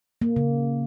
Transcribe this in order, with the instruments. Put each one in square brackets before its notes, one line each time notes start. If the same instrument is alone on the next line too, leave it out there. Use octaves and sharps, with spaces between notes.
[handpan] A#3
C#3